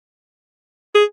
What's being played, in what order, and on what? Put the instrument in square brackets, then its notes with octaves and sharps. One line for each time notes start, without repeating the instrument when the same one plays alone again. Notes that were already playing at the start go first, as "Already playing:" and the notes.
[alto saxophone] G#4